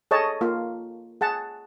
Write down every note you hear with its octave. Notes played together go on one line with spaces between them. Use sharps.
G#4 A4 C#5 D#5 A5
A#3 F4
G#4 F#5 A5